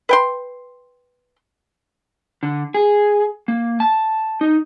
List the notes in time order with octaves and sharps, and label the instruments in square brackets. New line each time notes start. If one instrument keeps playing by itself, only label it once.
[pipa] B4 G5 C6
[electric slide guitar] D3
G#4
A#3
A5
D#4